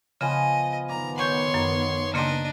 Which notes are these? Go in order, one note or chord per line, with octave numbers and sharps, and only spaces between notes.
C#3 F3 B3 D#5 G#5
D#3 B3 D5 A#5
C#5 F#5 C6 C#6 G6
F#2
C#3 A#3 D4 G4 D#5 A#5 C6